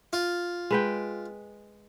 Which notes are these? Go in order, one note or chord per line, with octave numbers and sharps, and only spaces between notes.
F4
G#3 B4 G5